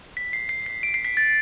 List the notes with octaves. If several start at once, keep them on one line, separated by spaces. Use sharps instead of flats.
B6
C7
C7
C7
D7
C7
B6
A6